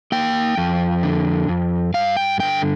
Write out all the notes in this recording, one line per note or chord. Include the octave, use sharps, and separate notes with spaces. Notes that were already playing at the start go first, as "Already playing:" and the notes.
A#3 G5
F2
D3
F2
G2 F5
G5
D3 G5